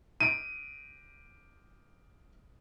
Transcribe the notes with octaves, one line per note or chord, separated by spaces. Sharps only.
D7 D#7